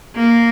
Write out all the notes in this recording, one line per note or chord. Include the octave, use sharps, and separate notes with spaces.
A#3